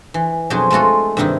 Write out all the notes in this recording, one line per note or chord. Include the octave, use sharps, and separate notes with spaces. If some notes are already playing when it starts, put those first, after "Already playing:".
E3
F2 B2 F#3 D4 G#4 C5
G#3 A3 F4 F#4 A4
G2 C3 D#3 D#4 E4